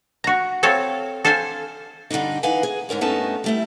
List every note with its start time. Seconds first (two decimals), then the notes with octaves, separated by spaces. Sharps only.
0.24 F#4 A#5
0.63 C4 A4 C#5 F5
1.25 A4 C5 F5 G#5
2.10 G2 D3 G3 D4 D#4
2.43 E3 D#4 B4 F5 F#5 G#5
2.63 G#4
2.89 G#2 D3 A#4 C#5
3.01 G2 A3 B3 C#4 D#4 A5
3.44 G3 A3 E4